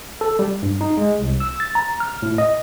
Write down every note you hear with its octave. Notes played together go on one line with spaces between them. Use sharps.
A4
G3
G2
D#4
G#3
C2
E6
A6
A#5
F6
A2
D#5